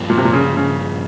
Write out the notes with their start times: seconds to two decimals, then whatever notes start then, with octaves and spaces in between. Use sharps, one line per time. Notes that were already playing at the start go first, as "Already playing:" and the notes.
Already playing: G2 F3 A#3
0.10 A#2
0.18 C3
0.25 A#2
0.33 C#3
0.57 C#3